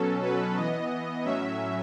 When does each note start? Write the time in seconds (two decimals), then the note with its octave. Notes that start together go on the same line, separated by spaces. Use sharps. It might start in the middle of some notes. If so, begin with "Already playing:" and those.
Already playing: B2 F#3 C#4 A4
0.22 B4
0.57 E3 B3 D#5
1.24 A2 F#3 C#4 E5